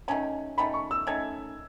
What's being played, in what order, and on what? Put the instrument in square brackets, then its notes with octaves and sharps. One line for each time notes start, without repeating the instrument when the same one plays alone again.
[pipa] D#3 A3 C#4 [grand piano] G#5
[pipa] D#3 A3 C#4 [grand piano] B5
[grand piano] C#6
E6
[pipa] D#3 A3 C#4 [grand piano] G#6